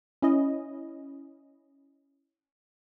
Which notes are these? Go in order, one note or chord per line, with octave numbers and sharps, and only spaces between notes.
C#4 E4 D#5